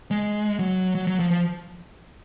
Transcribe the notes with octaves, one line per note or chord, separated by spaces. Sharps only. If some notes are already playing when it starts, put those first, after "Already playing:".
G#3
F#3
F#3
F#3
F3
F3